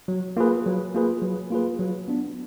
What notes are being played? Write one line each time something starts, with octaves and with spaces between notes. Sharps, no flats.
F#3
A#3 F4 G#4 B4
F#3
A#3 F4 G#4 B4
F#3
A#3 F4 G#4 B4
F#3
B3 D4